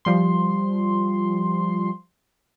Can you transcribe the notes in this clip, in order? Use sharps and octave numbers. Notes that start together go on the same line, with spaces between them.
F3 G3 C6